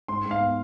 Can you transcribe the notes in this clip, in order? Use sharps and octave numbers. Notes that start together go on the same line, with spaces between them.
G#2 C6
G#2
F5
B3